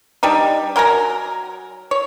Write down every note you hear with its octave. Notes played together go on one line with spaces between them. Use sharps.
G3 D4 D#4
F#3 A#4 G#5 A#5
C#5